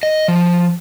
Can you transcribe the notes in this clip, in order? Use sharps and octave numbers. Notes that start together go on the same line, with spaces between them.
D#5
F3